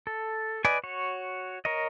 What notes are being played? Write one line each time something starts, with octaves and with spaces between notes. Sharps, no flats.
A4
B4 D5 D#5 G#5
F#4 C#5
A#4 C#5 D#5